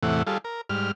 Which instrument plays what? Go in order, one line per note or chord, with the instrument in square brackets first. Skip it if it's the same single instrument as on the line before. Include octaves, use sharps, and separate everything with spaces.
[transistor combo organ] E2 A2 C3 E3 A3 F#5
G3 F4 G#4 A4
A#4
G#2 G3 F6